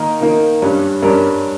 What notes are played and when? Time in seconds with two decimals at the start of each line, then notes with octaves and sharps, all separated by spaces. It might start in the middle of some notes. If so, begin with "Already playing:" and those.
Already playing: D#3 A#3 D#4 A#4
0.21 D#3 A#3 D#4
0.62 G2 G3 C#4
1.02 G2 G3 C#4 A#4